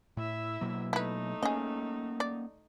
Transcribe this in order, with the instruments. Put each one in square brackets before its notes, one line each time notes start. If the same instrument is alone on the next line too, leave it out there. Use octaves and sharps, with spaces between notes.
[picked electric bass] A2 [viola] E4 E5
[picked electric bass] B2 F#3 A#3
[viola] A3 D#4 [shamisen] E4 B4
[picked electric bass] A#3 C#4 [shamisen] G#4 D#5
[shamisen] D5